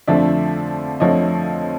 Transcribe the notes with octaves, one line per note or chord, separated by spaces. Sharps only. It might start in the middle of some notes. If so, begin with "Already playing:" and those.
F2 D3 F3 A3 D5 E5
F2 D3 F3 A3 C#5 D#5